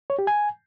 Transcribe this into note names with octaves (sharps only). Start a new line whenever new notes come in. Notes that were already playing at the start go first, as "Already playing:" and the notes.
C#5
G4
G#5